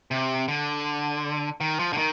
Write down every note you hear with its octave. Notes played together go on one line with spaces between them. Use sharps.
C3
D3
D#3
F3
D3
D#3